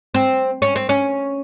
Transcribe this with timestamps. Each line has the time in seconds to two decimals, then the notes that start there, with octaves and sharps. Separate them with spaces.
0.14 C4
0.62 C#4
0.76 C4
0.89 C#4